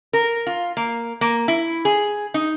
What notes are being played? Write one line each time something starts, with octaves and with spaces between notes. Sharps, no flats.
A#4
F4
A#3
A#3
E4
G#4
D#4